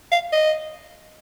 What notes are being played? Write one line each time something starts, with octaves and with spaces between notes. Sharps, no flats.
F5
D#5